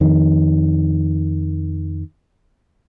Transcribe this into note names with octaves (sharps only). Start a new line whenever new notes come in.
F2 D#3